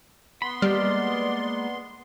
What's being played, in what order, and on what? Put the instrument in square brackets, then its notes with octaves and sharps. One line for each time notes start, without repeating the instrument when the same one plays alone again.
[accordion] B3 C6 [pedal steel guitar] B5
[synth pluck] G3 [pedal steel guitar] G#3 A#3 F6 [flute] D5